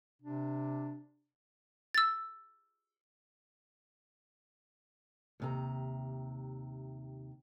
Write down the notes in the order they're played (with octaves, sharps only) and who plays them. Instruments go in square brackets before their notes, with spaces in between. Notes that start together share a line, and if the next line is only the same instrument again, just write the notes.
[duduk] C3 [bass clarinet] D4
[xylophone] E6 A6
[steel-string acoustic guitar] D#2 C3 A#5